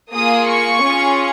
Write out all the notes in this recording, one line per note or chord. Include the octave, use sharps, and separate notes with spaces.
A#3 F4 G#4 D#6
C#6
C#4 F4 G#4